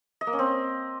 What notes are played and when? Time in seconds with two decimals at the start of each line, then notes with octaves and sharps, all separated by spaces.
0.21 D#5
0.27 A#3
0.33 C#4
0.39 C4